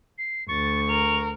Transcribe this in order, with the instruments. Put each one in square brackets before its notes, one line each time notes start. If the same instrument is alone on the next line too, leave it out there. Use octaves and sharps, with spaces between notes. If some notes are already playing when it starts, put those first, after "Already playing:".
[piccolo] C7
[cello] D2 [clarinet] C#6 [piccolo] A6
[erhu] A#4 [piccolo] F7